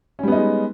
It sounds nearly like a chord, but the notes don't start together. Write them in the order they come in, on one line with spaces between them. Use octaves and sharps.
C#4 G3 B3 D#4 G#3